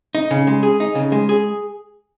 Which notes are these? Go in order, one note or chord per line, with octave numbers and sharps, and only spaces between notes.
D#4
C#3
G#3
G#4
D#4
C#3
G#3
G#4